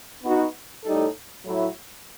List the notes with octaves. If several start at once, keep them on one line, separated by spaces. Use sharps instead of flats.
B3 D#4 F#4
A2 G3 D#4 A4
A2 F#3 A3 E4